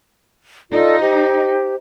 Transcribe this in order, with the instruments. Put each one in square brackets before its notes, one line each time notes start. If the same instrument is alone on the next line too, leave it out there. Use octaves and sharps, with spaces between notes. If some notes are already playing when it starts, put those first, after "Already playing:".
[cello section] D#4 [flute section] F4 A4 D5
[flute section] G4 C5